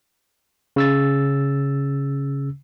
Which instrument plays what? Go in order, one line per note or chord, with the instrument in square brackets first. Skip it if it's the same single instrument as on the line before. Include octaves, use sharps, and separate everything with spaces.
[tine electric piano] C#3 E6 A6